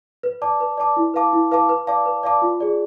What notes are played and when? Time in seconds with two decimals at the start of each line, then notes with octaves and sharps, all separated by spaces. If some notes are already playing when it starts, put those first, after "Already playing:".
0.23 B4
0.42 D5 A5 D6
0.61 B4
0.78 D5 A5 D6
0.97 E4
1.14 B4 F5 A5 D6
1.33 E4
1.52 B4 F5 A5 D6
1.69 B4
1.87 D5 F5 A5 D6
2.06 B4
2.23 D5 F5 A5 D6
2.42 F4
2.60 G#4 D5